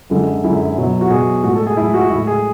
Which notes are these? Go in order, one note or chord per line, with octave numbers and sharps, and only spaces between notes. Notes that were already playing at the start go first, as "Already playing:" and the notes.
F#2 D3 G#3
F#2 D3 G#3 E4
B2 F#3
F#4
B2 F#3 G#4
A2 G#3 F#4
A4
G#4
A2 E4
G#3
F#4
A2 G#3 E4
G#4